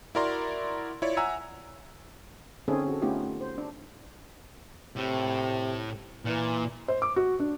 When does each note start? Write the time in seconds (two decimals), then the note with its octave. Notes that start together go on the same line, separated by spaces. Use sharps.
0.15 E4 F#4 A#4 D5 A#5 C6
1.02 E4 F4 C#5 D5
1.17 E5 F#5 G#5 A#5 E6
2.68 D3 C4 C#4 D#4 G#4 A4
2.88 F#4 A4
3.02 A3 B3 C#4 D#4 F4 G4
3.41 C5
3.58 D4
4.96 A2 C3
6.26 A#2 E3
6.88 C5
7.02 D6
7.16 F#4
7.40 D4